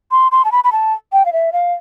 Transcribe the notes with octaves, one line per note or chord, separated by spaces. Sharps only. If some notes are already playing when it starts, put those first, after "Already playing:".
C6
C6
A5
B5
B5
A5
G5
F5
E5
F5